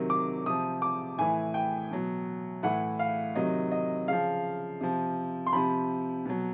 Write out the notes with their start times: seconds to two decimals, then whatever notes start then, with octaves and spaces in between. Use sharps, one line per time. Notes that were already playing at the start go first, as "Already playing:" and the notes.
Already playing: C3 D#3 F#3
0.10 D6
0.46 C3 F3 D#6
0.82 D6
1.18 A2 E3 G#5
1.54 G5
1.91 B2 F#3
2.63 A2 E3 F#5
2.99 F5
3.35 C3 D#3 F#3 D#5
3.72 D#5
4.08 C#3 F3 F5
4.81 C3 F3
5.47 C6
5.53 C3 F3 B5
6.26 B2 F#3